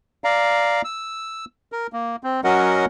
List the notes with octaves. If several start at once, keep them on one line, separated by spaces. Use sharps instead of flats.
D5 F5 A#5
E6
A#4
A#3
C4
F#3 C#4 F#4 A#4 D#5 F#5